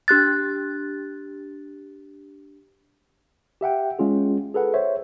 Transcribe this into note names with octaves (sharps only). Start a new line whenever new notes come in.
D4 G4 F#6 A6
G4 E5 F#5 G5
G#3 C#4 F4 G#4
G#4 A4 B4 F#5
C5 C#5 E5